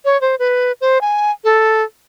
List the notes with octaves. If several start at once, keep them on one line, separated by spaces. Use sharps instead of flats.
C#5
C5
B4
C5
G#5
A4